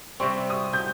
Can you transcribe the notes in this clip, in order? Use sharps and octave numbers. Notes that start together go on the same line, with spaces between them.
C3 G3 C4 C#6
D#6
G6